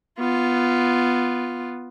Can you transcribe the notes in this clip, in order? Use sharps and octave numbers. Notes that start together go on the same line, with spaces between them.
B3 F4